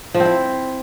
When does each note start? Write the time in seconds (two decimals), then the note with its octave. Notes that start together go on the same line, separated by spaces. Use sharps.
0.14 F3
0.20 C4
0.25 E4